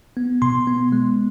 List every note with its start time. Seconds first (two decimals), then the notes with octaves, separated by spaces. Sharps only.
0.17 B3
0.42 B2 C6
0.67 B3
0.92 G#3